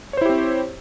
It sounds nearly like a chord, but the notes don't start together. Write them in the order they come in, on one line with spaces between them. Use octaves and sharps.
C#5 C5 E4 G4 C4